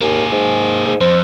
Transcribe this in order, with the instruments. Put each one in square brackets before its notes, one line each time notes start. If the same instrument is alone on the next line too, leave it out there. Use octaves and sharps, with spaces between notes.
[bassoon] D#2 [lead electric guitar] A#3 G#4
[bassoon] G#2
G#2
[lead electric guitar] F2 [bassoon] C5